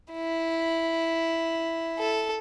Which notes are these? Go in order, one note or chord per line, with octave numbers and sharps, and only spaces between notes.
E4
A4